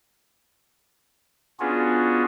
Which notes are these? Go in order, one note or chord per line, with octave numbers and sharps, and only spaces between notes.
B3 C#4 D4 F4 F#4 G#4